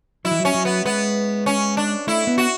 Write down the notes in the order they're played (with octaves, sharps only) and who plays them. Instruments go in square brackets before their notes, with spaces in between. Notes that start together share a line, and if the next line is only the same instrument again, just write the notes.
[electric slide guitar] F#3 [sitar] E4
[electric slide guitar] E3
F#3
[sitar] C#4
[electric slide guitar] F#3
[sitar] B3
[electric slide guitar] G#3 [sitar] B3
[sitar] C#4
D4
[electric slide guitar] A3 [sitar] E4
[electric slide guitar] B3
[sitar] F#4